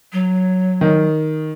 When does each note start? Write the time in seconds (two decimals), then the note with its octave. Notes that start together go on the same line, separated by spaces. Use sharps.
0.13 F#3
0.81 D#3